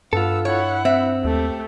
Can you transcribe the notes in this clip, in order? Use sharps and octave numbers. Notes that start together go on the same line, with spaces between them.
G2 B3 F4 A4 E6
E4 C#5 F#5
C4 E5
D#2 A3 G4